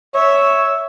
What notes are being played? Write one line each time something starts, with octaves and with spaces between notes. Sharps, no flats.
C#5 E5